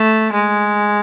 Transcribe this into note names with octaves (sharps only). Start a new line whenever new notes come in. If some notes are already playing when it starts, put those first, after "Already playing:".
Already playing: A3
G#3